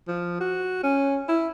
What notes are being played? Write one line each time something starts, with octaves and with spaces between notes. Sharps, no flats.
F3
F#4
C#4
E4